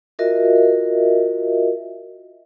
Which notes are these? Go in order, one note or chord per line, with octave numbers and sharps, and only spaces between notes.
F4 F#4 A#4 D#5 E5